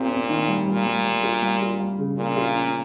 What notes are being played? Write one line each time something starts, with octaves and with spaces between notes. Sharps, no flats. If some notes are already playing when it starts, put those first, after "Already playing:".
Already playing: A#2 C4 G4
C4
D#3
G3
A#2 G3
G3
G3
F4
G3
F4
G3
C#3
A#2 C#3
F4
C#4